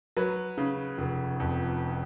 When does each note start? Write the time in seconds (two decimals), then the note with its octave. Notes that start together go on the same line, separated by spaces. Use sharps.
0.17 F#3 B4
0.58 C#3
0.98 F1
1.40 F2